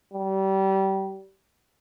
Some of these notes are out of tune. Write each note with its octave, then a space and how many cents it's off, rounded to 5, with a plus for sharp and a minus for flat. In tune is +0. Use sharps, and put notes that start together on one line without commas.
G3 -25